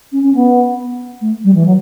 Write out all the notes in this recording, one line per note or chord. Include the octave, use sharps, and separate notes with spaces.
C#4
C#4
B3
A3
G3
E3
F#3